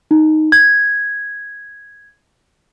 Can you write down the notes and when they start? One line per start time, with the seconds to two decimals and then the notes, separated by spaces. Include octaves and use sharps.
0.11 D#4
0.52 G#6